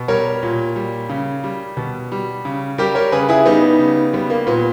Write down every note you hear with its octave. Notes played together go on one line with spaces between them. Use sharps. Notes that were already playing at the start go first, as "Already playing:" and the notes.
Already playing: B2
G3 A#4 C#5
A#2
G3
C#3
G3
B2
G3
C#3
G3 G4 A#4
A#4 C#5
C#3 G#4 B4
E4 G#4
G3 B3 D#4
C#3
G3 B3
A#3
A#2 B3